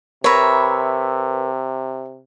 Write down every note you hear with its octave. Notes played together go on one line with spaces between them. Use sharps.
C3 A#4 B4 C#5 E5